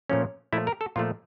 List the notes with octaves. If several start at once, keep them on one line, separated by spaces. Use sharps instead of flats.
A#2 F3 A3 C#4
A#2 F3 A3 E4
A#4
A4
A#2 F3 A3 F4